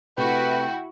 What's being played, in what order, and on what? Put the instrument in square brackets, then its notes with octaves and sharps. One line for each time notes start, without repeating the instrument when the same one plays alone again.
[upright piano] C3 A3 [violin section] E4 F#4 [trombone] B4 [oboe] G5